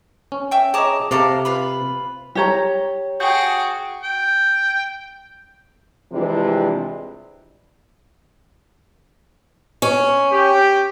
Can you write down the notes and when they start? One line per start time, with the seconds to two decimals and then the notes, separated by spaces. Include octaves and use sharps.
0.32 C#4
0.51 E5 G5
0.74 G#4 C#5 D#5 A5 A#5 D6
1.11 C3 A4 F5 A5 A#5 D6
1.45 F4 B4 B5
2.35 G4 C#5 A#5
3.20 F#4 G#4 G5 D6 G6
4.03 G5
6.12 C3 E3 F3 G3 G#3 D4
9.82 C#4
10.32 G4 G5